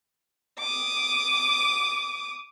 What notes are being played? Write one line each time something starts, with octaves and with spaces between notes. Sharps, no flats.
D6 D#6